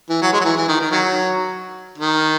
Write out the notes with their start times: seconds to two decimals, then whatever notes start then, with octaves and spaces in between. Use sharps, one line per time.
0.09 E3
0.22 F#3
0.33 G#3
0.41 F#3
0.44 E3
0.57 E3
0.68 D#3
0.80 D#3
0.91 D#3 F#3
1.98 D#3